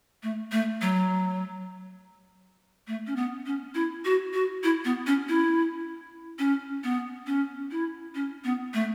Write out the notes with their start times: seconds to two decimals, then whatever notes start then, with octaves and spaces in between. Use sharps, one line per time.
0.23 A3
0.52 A3
0.81 F#3
2.87 A3
3.07 C#4
3.16 B3
3.46 C#4
3.75 E4
4.05 F#4
4.33 F#4
4.64 E4
4.85 B3
5.07 C#4
5.29 E4
6.39 C#4
6.84 B3
7.27 C#4
7.71 E4
8.15 C#4
8.44 B3
8.74 A3